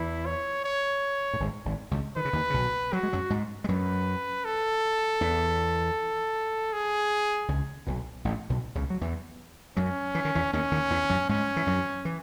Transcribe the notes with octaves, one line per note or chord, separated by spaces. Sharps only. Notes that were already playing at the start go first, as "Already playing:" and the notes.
Already playing: E2 E3 E4
C#5
C#5
A2
G#1 G#2
G#1 G#2
C#2 C#3
D#3 B4
C#3
D#2 D#3
C#3
B1 B2
F#3 F#4
G#3
F#2 F#3
G#2 G#3
G#3
F#2 F#3 B4
A4
E2 E3
G#4
C#2 C#3
B1 B2
A1 A2
B1 B2
C#2 C#3
F#3
E2 E3
F#2 F#3 C#4
E3
D#3
E2 E3
D#2 D#3 C#4
D#2 D#3
E2 E3
F#2 F#3
G#2 G#3 C#4
E3
F#2 F#3
E3